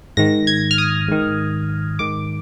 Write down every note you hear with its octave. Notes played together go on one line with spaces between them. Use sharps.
G#2 D#3 A#6
G#6
F6
D#6
G#2 D#3
G#2 D#3 D6